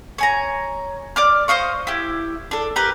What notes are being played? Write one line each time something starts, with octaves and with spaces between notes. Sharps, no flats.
C#5 G#5 A#5
D5 D6 F6
C5 D#5 F5 C#6
E4 G4
D4 A4
G4 A#4 B4